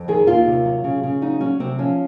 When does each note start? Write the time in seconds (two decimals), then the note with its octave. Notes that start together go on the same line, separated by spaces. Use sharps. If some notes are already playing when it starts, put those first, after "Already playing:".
Already playing: F2
0.08 D#3 G#4
0.27 D#2 F4
0.46 C3
0.65 F#3
0.84 C#3
1.03 C#3
1.22 F#3 D#4
1.41 F#3 C#4
1.60 C3 C4
1.78 F3 C#4